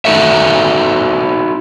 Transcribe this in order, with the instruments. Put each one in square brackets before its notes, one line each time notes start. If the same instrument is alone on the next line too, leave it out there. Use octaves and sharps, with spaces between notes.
[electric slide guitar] D#4 F#4 A4 E5